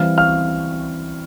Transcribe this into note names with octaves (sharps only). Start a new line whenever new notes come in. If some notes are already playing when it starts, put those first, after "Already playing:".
Already playing: E3 G3 C4 F5 F6
F5 F6